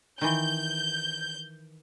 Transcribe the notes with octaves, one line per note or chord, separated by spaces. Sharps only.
D#3 E3 G6